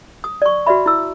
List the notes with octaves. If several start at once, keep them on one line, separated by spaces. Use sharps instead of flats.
D#6
D5 C#6
F#4 B4 D5 E5 B5
E4 E6